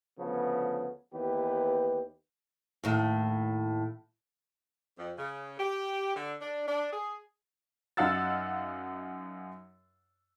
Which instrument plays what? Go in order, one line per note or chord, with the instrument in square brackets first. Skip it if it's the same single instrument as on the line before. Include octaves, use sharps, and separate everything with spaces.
[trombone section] D2 C#3 F3 B3
D#2 E3 B3 G4 B4
[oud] D#2 A2
[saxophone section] F2
C#3
G4
D3
D4
D4
G#4
[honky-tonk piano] F#2 D#4 F5 F#5 E6 A6